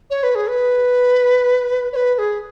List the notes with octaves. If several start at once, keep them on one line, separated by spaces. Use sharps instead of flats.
C#5
B4
G#4
B4
C#5
B4
B4
G#4